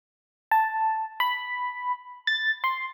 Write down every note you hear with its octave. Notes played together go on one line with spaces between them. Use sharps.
A5
B5
A6
C6